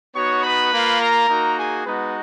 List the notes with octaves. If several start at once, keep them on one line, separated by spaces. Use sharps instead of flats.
B3 D#4 F#4 C#5 C#6
B4 B5
A#3 F4
A#4 A#5
A#3 D#4 F#4
G#4 G#5
G#3 B3 D#4 F#4 B4